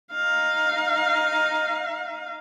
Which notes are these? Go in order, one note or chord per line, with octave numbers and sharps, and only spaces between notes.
D#4 F5